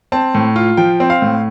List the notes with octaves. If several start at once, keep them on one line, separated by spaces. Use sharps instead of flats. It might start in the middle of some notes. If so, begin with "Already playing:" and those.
C4 A5
A2
F4
F3 G5
C4
F5
A2